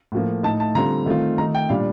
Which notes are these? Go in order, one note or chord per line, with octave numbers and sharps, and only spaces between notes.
A2 F3 A#3
A2 A3 D#4 A5
A5
D3 G3 C4 F4 A#5
D#3 A3 C4 F4
D#3 A3 D#4 A#5
G5
A#2 G3 D4 F5